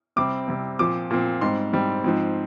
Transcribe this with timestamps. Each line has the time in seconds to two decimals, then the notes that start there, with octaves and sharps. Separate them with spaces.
0.16 C3 G3 C4 D6
0.48 C3 G3 C4
0.79 A#2 F3 C4 D6
1.10 A#2 F3 C4
1.41 G#2 G3 C4 C6
1.73 G#2 G3 C4
2.04 G#2 F3 C4